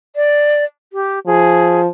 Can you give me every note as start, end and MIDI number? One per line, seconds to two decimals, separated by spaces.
0.16 0.64 74
0.93 1.19 67
1.26 1.87 53
1.26 1.80 68